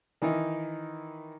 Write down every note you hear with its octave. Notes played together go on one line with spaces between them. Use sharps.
D#3 E3 D#4 E4